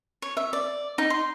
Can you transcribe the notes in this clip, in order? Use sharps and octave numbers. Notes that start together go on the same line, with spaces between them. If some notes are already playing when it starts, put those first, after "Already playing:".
C#5
E5
D5
D#4
C6